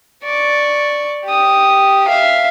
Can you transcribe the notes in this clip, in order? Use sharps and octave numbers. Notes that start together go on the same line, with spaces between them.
D5 C#6
G4 D#6
E5 F5